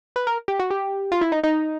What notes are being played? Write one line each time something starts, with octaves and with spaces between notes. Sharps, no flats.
B4
A#4
G4
F#4
G4
F4
E4
D#4
D#4